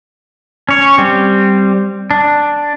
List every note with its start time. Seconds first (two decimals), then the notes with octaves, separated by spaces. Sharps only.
0.69 C#4 C#5
0.98 G3 C4
2.11 D4